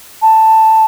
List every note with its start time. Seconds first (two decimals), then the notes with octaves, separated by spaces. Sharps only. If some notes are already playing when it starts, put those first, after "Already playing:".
0.22 A5